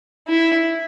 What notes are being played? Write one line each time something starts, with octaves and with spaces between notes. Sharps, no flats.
E4